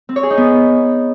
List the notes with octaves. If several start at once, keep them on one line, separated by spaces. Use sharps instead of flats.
C4
C#5
G#4
D#4
B3